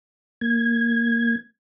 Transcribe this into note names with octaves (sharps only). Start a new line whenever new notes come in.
A#3 G#6